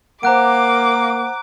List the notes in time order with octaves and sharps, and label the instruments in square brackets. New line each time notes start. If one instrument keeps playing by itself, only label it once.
[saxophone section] A#3 [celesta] C5 F#5 [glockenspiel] A#5 F#6 D7 [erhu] D6